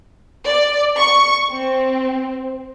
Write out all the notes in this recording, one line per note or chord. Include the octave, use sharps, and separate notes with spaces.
D5
C#6
C4